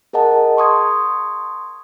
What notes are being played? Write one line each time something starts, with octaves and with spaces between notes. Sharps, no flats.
G#4 A#4 D#5 F#5 A5
C6 C#6 D#6 G#6